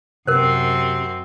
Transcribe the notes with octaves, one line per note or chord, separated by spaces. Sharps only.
F#2 C3 C4 A#4 C5